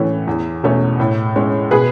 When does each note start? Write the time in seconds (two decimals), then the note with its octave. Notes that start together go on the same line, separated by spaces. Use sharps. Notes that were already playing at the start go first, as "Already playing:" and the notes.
Already playing: A2 E3 A3 C#4
0.27 E2
0.64 B2 A3 C#4
1.00 A2
1.36 G#3 C#4
1.71 B2 G#4 B4